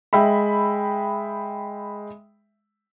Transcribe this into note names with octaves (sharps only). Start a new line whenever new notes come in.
G#3 E5 G5 B5